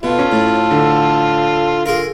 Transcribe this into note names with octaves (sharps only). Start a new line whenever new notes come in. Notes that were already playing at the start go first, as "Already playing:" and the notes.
B2 F4 A4
C#4
A2
D3
F4 G#4 A#4